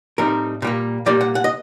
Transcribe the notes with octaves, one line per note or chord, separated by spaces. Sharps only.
A2 G3 C4 D#4 A#4
A#2 G3 A#3
A#2 G3 A#3 D5
F#5
F#5
D#5